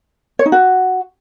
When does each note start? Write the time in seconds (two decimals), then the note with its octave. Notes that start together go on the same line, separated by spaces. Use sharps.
0.39 C#5
0.46 D#4
0.52 F#4